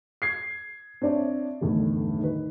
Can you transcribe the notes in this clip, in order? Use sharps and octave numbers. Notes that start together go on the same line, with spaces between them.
G#6 C7
C4 D4 C#5 D5 E5
G1 E2 A2 D#3
D#3 B4